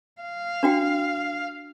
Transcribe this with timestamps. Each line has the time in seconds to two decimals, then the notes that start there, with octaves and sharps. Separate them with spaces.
0.22 F5
0.63 D4 F#4 G5